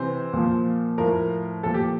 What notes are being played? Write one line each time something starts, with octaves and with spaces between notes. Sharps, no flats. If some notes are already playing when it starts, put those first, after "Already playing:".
Already playing: C3 E3 C5
A#2 F3
A2 F3 A#4
A#2 F3 A4
G4